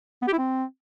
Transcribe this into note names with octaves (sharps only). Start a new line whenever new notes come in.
B3
G4
E4
C4